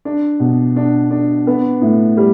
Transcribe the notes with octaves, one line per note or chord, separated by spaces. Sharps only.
D4
B2
D4
D4
B3
A2
G3